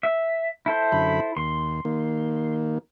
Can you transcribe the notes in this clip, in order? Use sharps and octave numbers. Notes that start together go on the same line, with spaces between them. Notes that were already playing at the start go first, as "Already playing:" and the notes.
E5
E4 A4 C5
F#2 D3 B5
D#2 C6
D#3 A#3